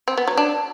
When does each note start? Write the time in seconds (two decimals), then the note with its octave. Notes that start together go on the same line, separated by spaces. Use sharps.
0.08 C4
0.18 B3
0.28 F#3
0.37 D4